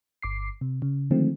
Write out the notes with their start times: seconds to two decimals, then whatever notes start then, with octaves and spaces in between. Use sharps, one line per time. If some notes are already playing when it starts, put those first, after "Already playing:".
0.22 G1 D6 C7
0.61 C3
0.82 C#3
1.11 D3 D#3 F3 G#3 A3 C4